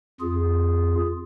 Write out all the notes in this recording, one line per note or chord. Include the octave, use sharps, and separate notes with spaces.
F2 F4 G#4